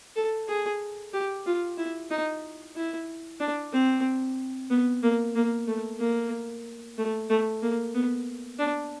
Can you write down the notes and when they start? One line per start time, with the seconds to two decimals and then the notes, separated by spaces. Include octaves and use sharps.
0.16 A4
0.48 G#4
1.13 G4
1.46 F4
1.78 E4
2.11 D#4
2.76 E4
3.40 D4
3.73 C4
4.70 B3
5.03 A#3
5.35 A#3
5.67 A3
6.00 A#3
6.98 A3
7.30 A3
7.62 A#3
7.94 B3
8.59 D4